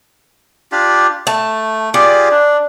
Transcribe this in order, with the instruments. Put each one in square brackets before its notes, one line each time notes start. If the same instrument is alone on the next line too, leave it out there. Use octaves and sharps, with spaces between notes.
[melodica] D4 F4 G4
[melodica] A3 [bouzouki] A5
[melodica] F4 G4 G#4 [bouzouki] D5
[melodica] D4